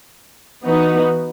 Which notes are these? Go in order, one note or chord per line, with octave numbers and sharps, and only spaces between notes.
E3 B3 D#4 F#4 B4